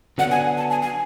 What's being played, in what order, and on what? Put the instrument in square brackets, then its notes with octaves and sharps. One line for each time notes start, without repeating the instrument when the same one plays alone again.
[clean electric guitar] D3 F#3 B3 D4 [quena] F#5
[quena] G#5
A5
G#5
G#5